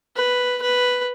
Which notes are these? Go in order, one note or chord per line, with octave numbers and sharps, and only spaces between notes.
B4
B4